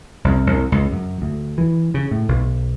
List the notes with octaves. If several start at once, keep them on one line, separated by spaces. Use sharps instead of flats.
C2
C2
C#2
F#2
D2
E3
C#3
A2
B1